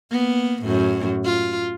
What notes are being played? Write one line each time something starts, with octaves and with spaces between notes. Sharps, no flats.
A#3 B3
F#2 A2
F4